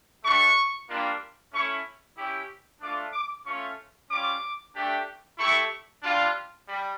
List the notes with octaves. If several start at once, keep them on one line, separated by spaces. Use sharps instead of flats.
A3 D4 G4 C#6
G3 A#3 D4 F4
A3 C#4 E4 C#6
C#4 E4 G4
A3 D4 F4 D6
D6
A3 C#4 F4 C#6
G3 C#4 F4 D6
A3 D4 G4
A3 E4 G4 C#6
G3 D4 F4
G3